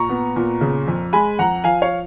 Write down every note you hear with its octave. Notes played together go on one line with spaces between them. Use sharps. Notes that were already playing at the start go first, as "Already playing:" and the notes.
Already playing: A#2 A#5 C#6
B3
A#2
C#3
F2
G#3 G#5 B5
F2 F#5 A#5
F3 F5 G#5
C#5 F5